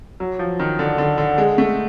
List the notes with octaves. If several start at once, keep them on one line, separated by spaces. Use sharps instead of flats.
F#3
F3
D#3
D3
D3
D3
G#3
A3